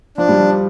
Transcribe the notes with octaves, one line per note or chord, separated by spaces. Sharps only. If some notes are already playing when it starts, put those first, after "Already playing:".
F3 D4
G3
F3